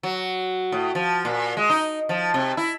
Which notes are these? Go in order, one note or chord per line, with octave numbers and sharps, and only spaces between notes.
F#3
A2
F3
A#2
G#3
D#4
F3
C3
E4